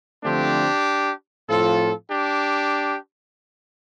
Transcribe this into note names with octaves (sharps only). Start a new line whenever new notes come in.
D3 F3 A3 C4 D4 G4
A2 F3 C4 F4 A4
D4 G4